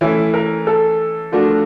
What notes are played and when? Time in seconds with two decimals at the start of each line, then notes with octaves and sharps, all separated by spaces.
0.01 E3 A3 C#4 E4
0.34 A#4
0.67 A4
1.32 F3 A3 D4 F#4 A#4